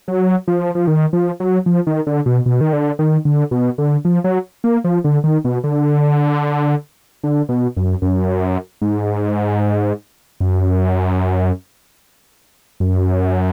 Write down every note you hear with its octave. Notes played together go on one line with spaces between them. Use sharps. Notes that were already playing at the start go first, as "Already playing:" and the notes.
F#3
F3
F3
D#3
F3
F#3
F3
D#3
D3
B2
B2
D#3
D3
D#3
D3
B2
D3
F3
F#3
A#3
F3
D3
D#3
B2
D3
D3
B2
F#2
F#2
G#2
F#2
F#2